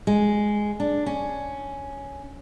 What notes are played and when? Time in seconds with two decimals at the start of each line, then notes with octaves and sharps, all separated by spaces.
0.07 G#3
0.80 D4
1.06 C#4